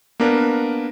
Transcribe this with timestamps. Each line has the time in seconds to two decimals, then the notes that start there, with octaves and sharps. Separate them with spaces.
0.20 A#3 B3 D4 A#4 B4